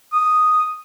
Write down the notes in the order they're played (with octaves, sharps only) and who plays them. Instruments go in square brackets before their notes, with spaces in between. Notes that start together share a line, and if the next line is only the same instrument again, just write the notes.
[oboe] D#6